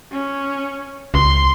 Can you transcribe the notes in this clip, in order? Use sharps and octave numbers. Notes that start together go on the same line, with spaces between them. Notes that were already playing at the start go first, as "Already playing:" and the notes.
C#4
C#2 C6